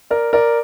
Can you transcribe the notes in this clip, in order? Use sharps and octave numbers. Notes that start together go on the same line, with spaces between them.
A#4 D5
A#4 D5